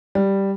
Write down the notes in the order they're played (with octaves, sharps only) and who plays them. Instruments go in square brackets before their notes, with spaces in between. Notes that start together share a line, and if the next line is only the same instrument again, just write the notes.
[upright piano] G3